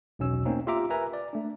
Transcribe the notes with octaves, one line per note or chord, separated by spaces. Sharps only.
B1 E2 B2 C#4 E6
A3 A#3 C4 C#4 D#4
F4 G4 E5 A#5 D6
A#4 B4 E5 G#5 A#5
D5
A3 D4